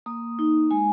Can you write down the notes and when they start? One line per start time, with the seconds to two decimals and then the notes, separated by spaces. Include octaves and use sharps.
0.06 A#3 D#6
0.39 D#4
0.71 G#3 G#5